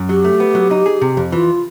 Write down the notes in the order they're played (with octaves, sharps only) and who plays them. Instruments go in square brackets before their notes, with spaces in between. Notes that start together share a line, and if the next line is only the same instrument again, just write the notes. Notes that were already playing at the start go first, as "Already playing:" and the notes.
Already playing: [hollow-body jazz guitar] F#2
[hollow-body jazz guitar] F#3 [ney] G4
[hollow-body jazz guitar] A3
B3
F#3
D#4
G#4
C3
F2
[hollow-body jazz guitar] E3 [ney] F4